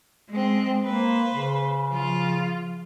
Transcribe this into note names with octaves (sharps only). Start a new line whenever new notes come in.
G#3 C4
A#3 B4 C5
C#3
F3 F4